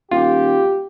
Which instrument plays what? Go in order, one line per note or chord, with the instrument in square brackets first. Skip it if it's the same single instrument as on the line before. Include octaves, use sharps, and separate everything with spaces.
[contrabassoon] D#1 [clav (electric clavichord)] F4 [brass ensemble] G4